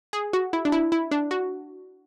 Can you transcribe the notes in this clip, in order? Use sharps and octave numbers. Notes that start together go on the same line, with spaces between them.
G#4
F#4
E4
D4
E4
E4
D4
F#4